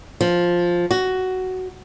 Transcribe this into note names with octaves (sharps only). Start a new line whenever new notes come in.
F3
F#4